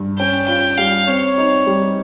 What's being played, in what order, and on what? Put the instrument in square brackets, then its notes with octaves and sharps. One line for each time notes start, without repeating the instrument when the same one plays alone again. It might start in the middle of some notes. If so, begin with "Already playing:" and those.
Already playing: [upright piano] G2
[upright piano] C#4 [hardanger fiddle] G5
[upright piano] F4 [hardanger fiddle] G5
[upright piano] G3 [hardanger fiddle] F5
[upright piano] C4 [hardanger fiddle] C#5
[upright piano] D#4
G3